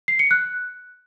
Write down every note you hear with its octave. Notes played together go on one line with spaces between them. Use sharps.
C7
C#7
F#6